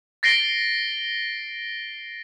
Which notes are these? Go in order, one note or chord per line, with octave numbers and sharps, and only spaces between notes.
A6 A#6 C7 D7 G7